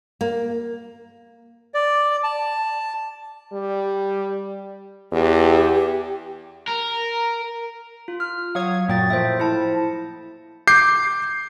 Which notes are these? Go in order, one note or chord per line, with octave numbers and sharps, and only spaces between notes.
A#3
D5
A5
G3
E2 G4
A#4
F4
F6
F#3 C#5 F5 D#6 G#6
F#2 A#2 F#3 A#3 G5 A6
A2 F3 C5 E5
E4 A5
D6 G6 C7